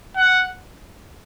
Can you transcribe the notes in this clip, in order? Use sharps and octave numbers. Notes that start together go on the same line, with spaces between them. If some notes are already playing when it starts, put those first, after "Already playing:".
F#5